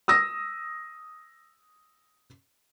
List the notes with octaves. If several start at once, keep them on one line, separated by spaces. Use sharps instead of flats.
D#6 E6 A#6